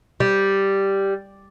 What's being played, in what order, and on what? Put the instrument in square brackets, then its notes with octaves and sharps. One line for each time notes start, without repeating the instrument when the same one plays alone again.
[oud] G3